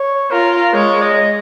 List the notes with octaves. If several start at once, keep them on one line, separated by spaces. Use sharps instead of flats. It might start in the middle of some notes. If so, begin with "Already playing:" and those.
Already playing: C#5
F4 A#4
G#3 C#5
D#5